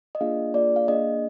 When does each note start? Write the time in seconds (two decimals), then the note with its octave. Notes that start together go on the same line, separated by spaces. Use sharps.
0.15 D#5
0.21 A#3 D4 F4 G#4 F5
0.54 A#3 D4 F4 G#4 D5
0.76 F5
0.88 A#3 D4 G#4 D#5